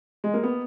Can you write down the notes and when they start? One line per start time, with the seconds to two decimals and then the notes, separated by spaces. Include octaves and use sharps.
0.24 G#3
0.34 A#3
0.43 B3